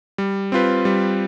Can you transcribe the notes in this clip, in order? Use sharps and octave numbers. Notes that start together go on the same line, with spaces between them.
G3
C4 F4 B4
G3